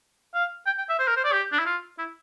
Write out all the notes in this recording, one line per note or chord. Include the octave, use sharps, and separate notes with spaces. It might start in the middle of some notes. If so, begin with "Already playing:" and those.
F5
G5
G5
E5
C5
A#4
C5
D5
G4
D4
E4
F4
E4